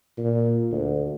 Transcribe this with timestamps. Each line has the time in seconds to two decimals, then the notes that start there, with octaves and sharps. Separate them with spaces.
0.17 A#2
0.71 D2